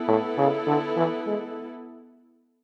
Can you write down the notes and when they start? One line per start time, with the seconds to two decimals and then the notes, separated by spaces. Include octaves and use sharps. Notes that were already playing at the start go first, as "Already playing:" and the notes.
Already playing: B3 E4 A4
0.08 A2
0.38 C#3
0.67 D3
0.97 E3
1.26 G#3